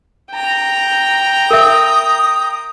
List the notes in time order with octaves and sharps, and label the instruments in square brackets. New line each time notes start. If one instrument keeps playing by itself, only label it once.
[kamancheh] G5 A#5
[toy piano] A#4 E5 [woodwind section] D#6